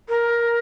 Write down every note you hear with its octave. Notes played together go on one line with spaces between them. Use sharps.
A#4